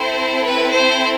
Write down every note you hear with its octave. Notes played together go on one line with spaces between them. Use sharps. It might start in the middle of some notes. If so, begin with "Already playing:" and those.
Already playing: C4 E4 A4 C5
B4
C5